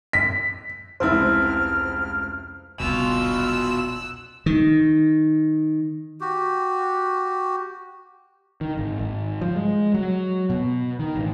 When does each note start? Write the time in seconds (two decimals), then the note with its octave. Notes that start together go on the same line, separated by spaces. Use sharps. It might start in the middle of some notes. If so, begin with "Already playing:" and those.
0.13 B6
1.00 F1 C#2 E4 C5 F6
2.80 F1 C2 B2 B3 F4 E6 F#6
4.46 D#3
6.21 F#4 G4
8.61 D#3
8.77 G#1
8.99 G#1
9.41 F3
9.56 G#3
9.94 F#3
10.50 B2
10.99 D#3
11.16 A1